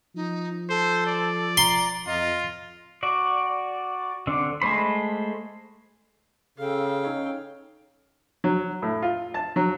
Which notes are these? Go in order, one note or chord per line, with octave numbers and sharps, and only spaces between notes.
F3 D#4
A4 C5
D5
A#5 C6
F2 F4 D#5
F#4 D5
D3 C4 D4
G#3 A3 C5 B5
C#3 A4 F5 G5
C#4 D#4 C#5
F#3
A2
F4
A5
F#3